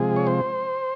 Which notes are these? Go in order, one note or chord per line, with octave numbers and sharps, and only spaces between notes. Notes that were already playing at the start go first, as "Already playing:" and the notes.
Already playing: C3 F3 G#3 G#4
C#5
C5